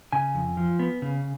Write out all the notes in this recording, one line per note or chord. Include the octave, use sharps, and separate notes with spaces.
C#3 G#5
F2
F3
B3
C#3